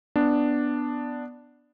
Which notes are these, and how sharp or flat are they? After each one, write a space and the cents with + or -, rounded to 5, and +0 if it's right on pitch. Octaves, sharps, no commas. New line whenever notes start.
B3 +0 D4 +0